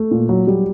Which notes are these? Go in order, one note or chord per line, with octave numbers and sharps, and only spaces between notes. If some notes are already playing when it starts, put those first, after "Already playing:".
Already playing: A3
A#2
F#3
G3